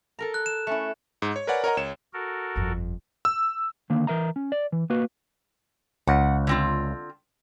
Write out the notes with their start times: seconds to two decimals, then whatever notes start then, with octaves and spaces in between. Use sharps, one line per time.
0.19 A4 A#4 A#5
0.34 F#6
0.46 E7
0.67 A3 C#4 E4
1.22 G#2
1.36 C#5
1.47 A#4 B4 C#5 D5 F#5 G#5
1.64 A#4 C#5 D#5 F#5 A#5
1.77 C#2 C#5 E7
2.13 F#4 A4 A#4
2.56 G1 F2
3.25 E6
3.90 D3 D#3 A#3
4.07 E3 A#4 E5 A#5
4.36 C#4
4.52 D5
4.72 E3
4.90 A#3 F#4 B4
6.07 C#2 F#5
6.47 D3 C4 F4